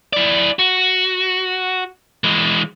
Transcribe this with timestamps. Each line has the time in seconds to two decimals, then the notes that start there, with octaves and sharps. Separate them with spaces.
0.13 E4 D5
0.59 F#4
2.24 E3 G#3